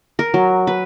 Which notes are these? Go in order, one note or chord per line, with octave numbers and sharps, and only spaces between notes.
A#4
F#3
B4